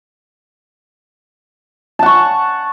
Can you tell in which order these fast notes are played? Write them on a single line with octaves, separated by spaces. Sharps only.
A5 F#5 C#6